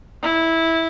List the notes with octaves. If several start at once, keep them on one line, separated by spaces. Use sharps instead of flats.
E4